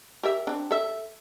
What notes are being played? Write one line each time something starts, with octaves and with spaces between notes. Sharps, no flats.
G4 A#4 E5
C4 D4
A4 E5